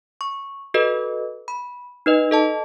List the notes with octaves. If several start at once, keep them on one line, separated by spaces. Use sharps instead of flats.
C#6
F#4 A4 B4 D#5
B5
D#4 B4 D#5
A4 D#5 A5